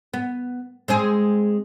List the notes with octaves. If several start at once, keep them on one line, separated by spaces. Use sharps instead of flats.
B3
G#3 C4 G#4